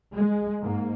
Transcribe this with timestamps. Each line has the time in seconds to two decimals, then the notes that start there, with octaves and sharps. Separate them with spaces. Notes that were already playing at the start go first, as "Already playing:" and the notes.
0.13 G#3
0.62 G#2 A#3